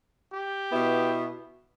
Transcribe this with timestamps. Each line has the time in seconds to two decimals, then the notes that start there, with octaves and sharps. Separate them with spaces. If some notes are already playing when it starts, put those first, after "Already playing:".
0.31 G4
0.71 B2 B3 E4